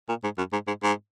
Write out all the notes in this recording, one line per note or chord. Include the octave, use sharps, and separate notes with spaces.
A#2
G#2
F#2
G#2
G#2
G#2